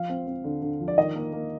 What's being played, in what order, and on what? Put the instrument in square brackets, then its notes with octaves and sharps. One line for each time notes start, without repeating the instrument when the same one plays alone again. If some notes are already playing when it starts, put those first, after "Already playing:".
Already playing: [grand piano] F3 F5
C4
C4
D3
D3
F3
D5
D#3 D#5
A#3
A#3